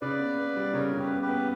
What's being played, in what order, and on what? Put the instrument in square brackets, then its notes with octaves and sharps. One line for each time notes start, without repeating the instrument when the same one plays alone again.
[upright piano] C#3 [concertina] B4 D5
[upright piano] B3
B3
G3
[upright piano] C#3 [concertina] A#4 C#5
[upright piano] C#3
[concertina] G4 B4
[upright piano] B3
[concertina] G4 B4
[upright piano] B3